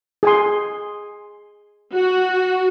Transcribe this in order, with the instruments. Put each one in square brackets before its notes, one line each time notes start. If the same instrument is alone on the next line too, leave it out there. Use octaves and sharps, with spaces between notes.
[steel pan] G#4 G#5 C6
[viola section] F#4